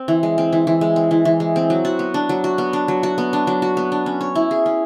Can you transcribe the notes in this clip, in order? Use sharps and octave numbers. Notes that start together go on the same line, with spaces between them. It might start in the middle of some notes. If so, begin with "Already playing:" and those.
Already playing: C4
E3
G#3
C4
E3
E3
G#3
C4
E3
E3
G#3
C4
F#3
F#4
B3
D4
F#3
F#4
B3
D4
F#3
F#4
B3
D4
F#3
F#4
B3
D4
C#4
C#5
E4
G#4
C#4